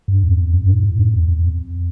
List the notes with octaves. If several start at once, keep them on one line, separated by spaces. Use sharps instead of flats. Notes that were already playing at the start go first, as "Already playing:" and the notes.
G2
E2
F2
F2
G2
A2
A2
F2
E2
E2
F2